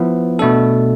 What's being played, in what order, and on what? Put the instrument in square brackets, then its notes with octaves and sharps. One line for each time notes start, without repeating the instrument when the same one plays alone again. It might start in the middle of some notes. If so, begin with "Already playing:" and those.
Already playing: [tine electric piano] F3 B3 E4
B2 A3 D4 A4